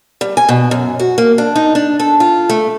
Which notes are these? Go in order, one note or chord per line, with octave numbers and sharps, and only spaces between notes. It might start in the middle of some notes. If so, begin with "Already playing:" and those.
G3
G#5
B2
F#2
F#4
A#3
D4
D#4
D4
A4
F4
A3